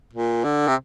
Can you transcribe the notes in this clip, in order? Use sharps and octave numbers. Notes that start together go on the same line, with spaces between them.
A#2
D3
C3